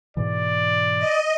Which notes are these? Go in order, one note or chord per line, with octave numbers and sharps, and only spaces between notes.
G#2 B2 E3 D5
D#5